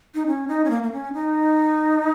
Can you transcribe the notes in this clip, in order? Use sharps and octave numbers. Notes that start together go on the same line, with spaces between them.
D#4
C#4
D#4
C#4
A#3
A#3
C#4
D#4